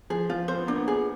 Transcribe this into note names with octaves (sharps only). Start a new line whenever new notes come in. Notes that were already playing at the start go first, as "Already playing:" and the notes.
F3 G#4
F3 F4
C4 C5
B3
A#3 D4
B3
G#4